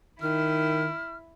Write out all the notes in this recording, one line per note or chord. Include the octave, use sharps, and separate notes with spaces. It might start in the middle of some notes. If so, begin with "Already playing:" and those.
D#3 E4 F6